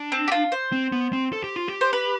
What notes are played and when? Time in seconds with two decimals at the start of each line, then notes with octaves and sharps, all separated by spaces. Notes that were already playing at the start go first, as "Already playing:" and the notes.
Already playing: D4
0.12 C4
0.28 G4
0.32 F4
0.52 C5
0.72 C4
0.92 B3
1.13 C4
1.33 A4
1.44 G4
1.56 F4
1.68 G4
1.81 C5
1.93 B4